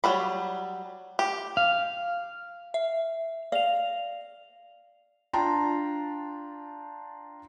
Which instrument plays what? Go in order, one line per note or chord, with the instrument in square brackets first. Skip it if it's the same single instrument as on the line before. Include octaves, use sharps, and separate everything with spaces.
[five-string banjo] F#3 G3 B5
G4
[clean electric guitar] F5
[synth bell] E5
[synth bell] D5 F7 [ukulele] F5
[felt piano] D4 F4 G5 A5 A#5 C6